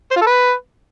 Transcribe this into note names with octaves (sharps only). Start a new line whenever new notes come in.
C5
F4
A4
B4